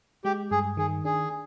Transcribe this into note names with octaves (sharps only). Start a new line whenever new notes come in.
G#3 G4
G2 G#4
D#3 G#4
D4 G#4